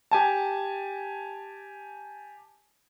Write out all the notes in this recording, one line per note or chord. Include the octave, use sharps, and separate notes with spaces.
G4 G#5 A5